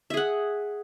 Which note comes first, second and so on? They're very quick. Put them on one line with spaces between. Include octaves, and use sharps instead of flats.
E5 G#4 F#5